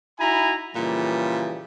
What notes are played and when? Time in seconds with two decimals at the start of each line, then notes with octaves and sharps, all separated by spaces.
0.19 D#4 E4 F#4 G#5 A#5 B5
0.75 A#2 C#3 E3 F3 G3